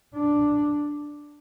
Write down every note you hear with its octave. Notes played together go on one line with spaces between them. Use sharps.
D4